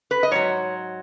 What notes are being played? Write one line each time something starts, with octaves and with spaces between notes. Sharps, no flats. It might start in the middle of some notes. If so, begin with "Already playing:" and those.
B4
D#5
G#2 F#3 C#5